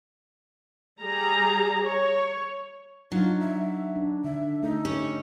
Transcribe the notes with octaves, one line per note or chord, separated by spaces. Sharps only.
G3 G#4 A#5
C#5
F#3 D4 D#4 F4
E5
D4
D3 E5
A3 D#4 A4
C#4 G4 C#5